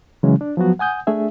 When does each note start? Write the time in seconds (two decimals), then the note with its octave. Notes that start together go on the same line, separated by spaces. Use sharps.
0.23 C#3 E3 F#3 G#3 C#4
0.41 D4
0.57 F3 F#3 B3 F#4
0.79 F#5 G#5 D#6 G6
1.07 A3 D4 G#4 E5